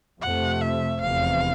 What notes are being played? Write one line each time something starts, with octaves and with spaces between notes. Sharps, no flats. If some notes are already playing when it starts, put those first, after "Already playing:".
F2 C3 F3 A3 F#5
E5
F1 E2 C3 F5